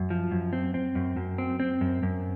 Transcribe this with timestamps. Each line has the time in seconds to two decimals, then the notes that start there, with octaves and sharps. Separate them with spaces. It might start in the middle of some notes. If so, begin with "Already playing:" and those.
Already playing: F#2
0.10 F3
0.31 F#2
0.53 C4
0.74 C4
0.95 F#2
1.16 F#2
1.38 C4
1.60 C4
1.81 F#2
2.03 F#2